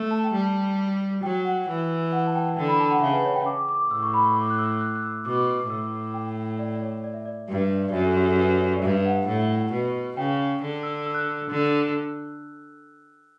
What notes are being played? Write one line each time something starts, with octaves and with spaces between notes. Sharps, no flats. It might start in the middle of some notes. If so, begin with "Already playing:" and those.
Already playing: A3
A5
G5
G3 A5
F#3 G5
F#5
E3
F#5
A5
G5
D3 G5
B5
A5
F#5
C#3 E5
B4
C#5
G5
D6
D6
A2 E6
C#6
B5
C#6
D6
F#6
E6
F#6
F#6
E6
B2 D6
A2 E6
G5
D5
D5
C#5
D5
E5
D5
G2 E5
D5
F#2 E5
A4
G4
A4
B4
C#5
D5
G2 E5
F#5
A2
B2
C#3 G5
D3
E6
E6
F#6
E6
D3